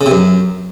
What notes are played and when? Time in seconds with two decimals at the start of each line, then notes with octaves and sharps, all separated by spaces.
0.01 C#3
0.06 C3
0.11 F#2